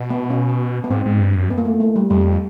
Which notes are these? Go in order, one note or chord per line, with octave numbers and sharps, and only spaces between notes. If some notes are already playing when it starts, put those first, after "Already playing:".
Already playing: B2
B3
C#4
B3
G#2 C4
G#2
G2
F#2
B3
A#3
A3
A3
G3
F2 G3